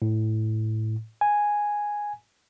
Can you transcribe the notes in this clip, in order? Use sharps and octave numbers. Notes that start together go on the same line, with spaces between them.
A2
G#5